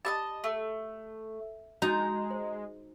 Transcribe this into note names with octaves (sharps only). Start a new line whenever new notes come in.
G4 D#5 E5 A5 B5 D6
A3
G#3 D#4 F#4 D#5 A#5 G6
C5